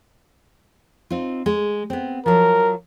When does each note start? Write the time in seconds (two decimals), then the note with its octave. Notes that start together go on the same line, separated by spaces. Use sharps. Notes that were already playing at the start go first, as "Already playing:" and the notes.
1.10 C4 D#4 F4
1.46 G#3
1.90 B3 C4
2.26 F3 F#3 A#4